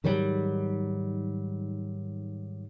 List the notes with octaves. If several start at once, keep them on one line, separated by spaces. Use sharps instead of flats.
G#2 D#3 F#3 G3